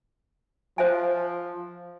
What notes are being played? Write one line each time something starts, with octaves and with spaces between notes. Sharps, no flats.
F3 C5 E5 G#5